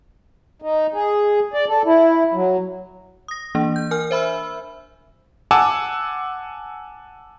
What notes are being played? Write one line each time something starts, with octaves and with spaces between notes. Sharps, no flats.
D#4
G#4
D5
A4
E4
F#3
D#6 A#6
E3 A#3 D4
G6
A#4 G#5 F6
C5 E5 B5 E6
F#5 G#5 A5 D6 E6